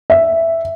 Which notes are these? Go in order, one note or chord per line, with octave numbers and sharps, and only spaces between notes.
E5